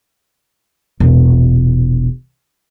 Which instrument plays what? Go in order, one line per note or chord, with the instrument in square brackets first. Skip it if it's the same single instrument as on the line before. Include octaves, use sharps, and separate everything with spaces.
[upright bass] E1 A#1